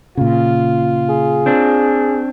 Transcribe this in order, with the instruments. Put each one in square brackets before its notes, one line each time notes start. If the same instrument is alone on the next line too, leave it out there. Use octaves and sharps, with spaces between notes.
[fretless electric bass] A#2 C#3 [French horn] F4
[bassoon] G#4
[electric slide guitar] C4 D4